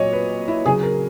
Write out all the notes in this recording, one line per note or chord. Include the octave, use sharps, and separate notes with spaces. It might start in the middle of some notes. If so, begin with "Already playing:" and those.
Already playing: A#2 F#3 C#5 D#5
B4
E4
C#3 F#3 G#4
A#4